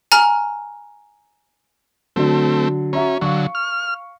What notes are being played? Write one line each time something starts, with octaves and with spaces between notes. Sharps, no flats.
G#5 A#5 F6
D3 F#3 A3 C4
C#4 F#4 E5 A#5
D3 F#3 F5 C#6
F6